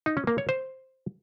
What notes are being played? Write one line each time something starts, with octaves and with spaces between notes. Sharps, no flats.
D#4
C#4
A#3
C#5
C5